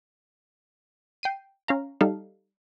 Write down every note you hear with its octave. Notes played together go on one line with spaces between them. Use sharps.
G5 C7 D#7
C#4 F5 A#5
G3 D#4 A4 F5